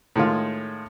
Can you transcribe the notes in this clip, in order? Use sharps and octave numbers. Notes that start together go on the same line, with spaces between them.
A2 D#3 G#3 F4